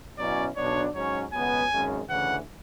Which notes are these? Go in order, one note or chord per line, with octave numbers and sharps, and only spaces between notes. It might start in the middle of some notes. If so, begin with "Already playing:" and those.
B2 F#3 C#4 E4 D5
B1 B2 F#3 B3 D4 C#5
G#2 F#3 C#4 C#5
C#2 B2 F#3 B3 G#5
G#1 F#2 C#3 G#3 C#4
D2 C#3 E3 F#5